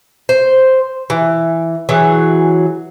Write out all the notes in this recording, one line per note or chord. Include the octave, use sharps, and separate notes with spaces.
C5
E3
E3 F#3 G#4